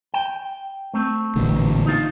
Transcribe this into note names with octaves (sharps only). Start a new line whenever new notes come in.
G5
A3 C4
A1 A#2 D3
D#4 F4